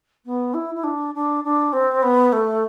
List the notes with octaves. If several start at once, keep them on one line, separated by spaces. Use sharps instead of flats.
B3
E4
E4
D4
D4
D4
C4
B3
A3